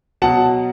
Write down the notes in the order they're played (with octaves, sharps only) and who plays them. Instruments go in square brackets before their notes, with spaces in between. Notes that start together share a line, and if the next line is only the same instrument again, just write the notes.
[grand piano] B2 F#3 F#5 A5